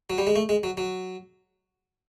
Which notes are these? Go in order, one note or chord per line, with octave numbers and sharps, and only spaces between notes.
F#3
G3
G#3
A3
G#3
F#3
F#3